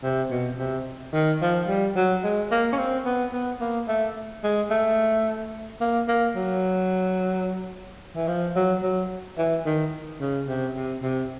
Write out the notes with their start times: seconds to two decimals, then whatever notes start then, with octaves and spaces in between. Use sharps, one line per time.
0.03 C3
0.31 B2
0.58 C3
1.13 D#3
1.41 F3
1.68 G3
1.96 F#3
2.23 G#3
2.51 A#3
2.72 C#4
2.78 C4
3.05 B3
3.33 B3
3.61 A#3
3.88 A3
4.43 G#3
4.70 A3
5.81 A#3
6.08 A#3
6.36 F#3
8.16 E3
8.28 F3
8.56 F#3
8.83 F#3
9.38 E3
9.66 D#3
10.20 C#3
10.48 C3
10.75 C3
11.03 C3